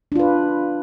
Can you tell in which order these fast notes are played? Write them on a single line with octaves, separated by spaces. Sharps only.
D4 F4 B4